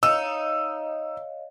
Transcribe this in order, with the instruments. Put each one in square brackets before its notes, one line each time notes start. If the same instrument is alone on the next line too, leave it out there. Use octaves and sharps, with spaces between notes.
[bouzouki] D#4 [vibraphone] C#5 D#5 F5 [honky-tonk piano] E6